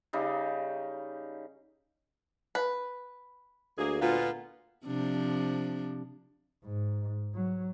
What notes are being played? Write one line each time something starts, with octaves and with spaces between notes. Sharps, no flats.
C#3 G3 D#4
B4
D2 A#3 G#4
A#2 B3 F4
C3 F3 D4
G#2
F#3